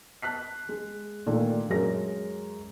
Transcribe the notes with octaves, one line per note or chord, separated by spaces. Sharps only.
A5 F#6 B6 C7
G#3
A#2 D#3 A3 D4
F#2 G#3 A#4 A#6